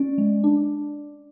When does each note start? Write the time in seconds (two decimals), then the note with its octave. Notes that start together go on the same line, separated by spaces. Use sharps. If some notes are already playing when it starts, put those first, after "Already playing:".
Already playing: C#4 D5
0.18 G#3
0.44 D4